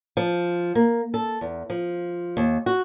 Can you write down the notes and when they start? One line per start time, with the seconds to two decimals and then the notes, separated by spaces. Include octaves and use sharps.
0.17 F3
0.75 A#3
1.14 A4
1.41 E2
1.70 F3
2.37 D#2
2.66 F#4